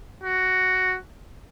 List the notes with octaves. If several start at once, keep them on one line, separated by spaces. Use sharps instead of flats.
F#4